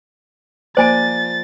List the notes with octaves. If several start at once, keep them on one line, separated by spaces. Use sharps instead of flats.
F3 A#3 C5 D5 G#5 F#6 A6 D7